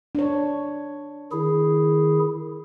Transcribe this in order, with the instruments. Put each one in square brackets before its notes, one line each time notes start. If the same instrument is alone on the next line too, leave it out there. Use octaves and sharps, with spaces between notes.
[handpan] D4 C#5
[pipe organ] D#3 E4 G#4